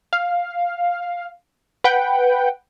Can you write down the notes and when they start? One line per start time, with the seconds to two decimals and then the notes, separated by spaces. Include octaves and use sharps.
0.13 F5
1.84 B4 F#5 G5